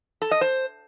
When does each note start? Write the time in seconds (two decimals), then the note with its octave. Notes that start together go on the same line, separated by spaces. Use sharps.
0.22 A4
0.31 D#5
0.41 C5